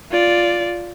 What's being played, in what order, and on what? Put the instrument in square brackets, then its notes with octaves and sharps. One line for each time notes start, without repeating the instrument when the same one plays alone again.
[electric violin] F4 D5